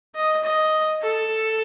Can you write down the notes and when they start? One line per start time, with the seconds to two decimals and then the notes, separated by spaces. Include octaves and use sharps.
0.16 D#5
0.44 D#5
1.02 A4